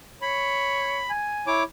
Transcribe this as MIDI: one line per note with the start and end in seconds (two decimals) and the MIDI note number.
0.22 1.04 73
0.22 1.11 83
1.10 1.50 80
1.47 1.63 64
1.47 1.63 73
1.47 1.63 86